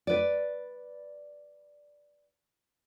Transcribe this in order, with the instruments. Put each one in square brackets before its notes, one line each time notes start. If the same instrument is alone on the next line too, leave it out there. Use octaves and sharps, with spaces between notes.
[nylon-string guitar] B4 D5